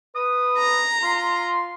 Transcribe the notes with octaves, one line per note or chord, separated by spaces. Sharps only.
B4 D#6
A#5
F4 C6